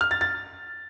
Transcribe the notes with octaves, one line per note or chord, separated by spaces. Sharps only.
F6
A6
A6